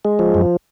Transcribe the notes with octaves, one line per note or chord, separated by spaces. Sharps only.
G#3
F3
F#2